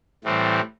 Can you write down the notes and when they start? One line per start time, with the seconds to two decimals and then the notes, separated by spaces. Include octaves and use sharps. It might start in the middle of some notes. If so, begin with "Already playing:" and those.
0.24 A2 E3 G3 C4